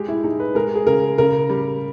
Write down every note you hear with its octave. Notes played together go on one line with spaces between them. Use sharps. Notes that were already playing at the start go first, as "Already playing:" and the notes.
Already playing: G#3 G4
E4
G#3 D#4
B4
G#3 A#4
G#4
C#3 A#4
C#3 A#4
G3